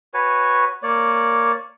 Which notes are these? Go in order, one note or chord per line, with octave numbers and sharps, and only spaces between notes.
F#4 B4 C#5 G#5
A#3 C#5 D5